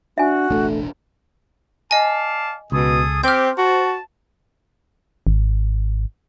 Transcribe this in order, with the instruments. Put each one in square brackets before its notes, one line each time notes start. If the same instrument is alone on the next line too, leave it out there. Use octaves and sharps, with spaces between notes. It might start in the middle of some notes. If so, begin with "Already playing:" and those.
[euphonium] D4 [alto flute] F#4 [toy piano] E5 G#5
[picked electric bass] E1 A1 D4 [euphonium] A3
[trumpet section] D5 F5 A5 [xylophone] D#5 G#5
[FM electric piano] C#2 [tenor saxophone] B2 [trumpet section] G#4 A4 D#6
[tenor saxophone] C4 [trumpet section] G4 [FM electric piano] C5 [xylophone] F6 G6
[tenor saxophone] F#4 [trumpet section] A5
[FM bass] G#1